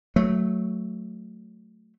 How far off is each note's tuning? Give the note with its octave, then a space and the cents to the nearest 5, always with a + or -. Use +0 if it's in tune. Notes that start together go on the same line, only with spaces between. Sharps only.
F#3 +0 A3 +0